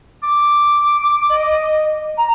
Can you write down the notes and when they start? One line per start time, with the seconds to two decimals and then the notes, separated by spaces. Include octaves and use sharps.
0.23 D6
1.29 D#5
2.17 A#5